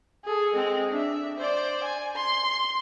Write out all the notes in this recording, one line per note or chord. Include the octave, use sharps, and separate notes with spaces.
G#4 A4
G#3 C4
D4 E5
C5 D5
G#5
C6